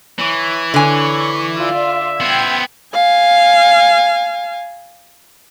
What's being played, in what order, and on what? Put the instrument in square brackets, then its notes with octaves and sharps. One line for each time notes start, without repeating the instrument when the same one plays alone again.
[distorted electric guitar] E3 [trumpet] C#5
[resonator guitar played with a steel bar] D3 G#5 [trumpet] C#5 [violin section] C#6
[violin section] F4 D5 [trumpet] E5
[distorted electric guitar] B3 C5 [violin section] G5 G#6
[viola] F5 G#5